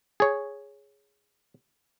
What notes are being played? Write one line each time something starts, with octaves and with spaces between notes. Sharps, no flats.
G#4 C#5